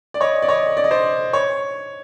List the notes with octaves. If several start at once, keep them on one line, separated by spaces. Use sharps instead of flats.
D5
C#5 D#5
D5
C#5 D#5
D5
D#5
C5 D5
C#5